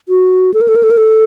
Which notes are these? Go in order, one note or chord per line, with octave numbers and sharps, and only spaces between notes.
F#4
A4
A#4
A4
A#4
A4
A#4
A4